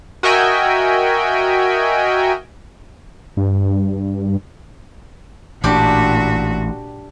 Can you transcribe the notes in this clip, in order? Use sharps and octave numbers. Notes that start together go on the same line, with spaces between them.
F#4 A#4 D#5 E5 G5 G#5
G2
A1 A#2 D4 F#4 G4